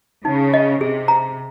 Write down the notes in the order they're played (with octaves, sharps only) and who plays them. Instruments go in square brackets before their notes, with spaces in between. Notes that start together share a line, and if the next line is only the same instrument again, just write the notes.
[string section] C#3 [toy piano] D#4
[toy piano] D#5
[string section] C3 [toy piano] G#4
[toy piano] A#5